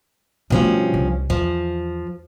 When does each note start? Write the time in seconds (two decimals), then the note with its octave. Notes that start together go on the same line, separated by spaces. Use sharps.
0.50 G2 B2 F3 A3 C#4
0.94 C2
1.30 E2 F3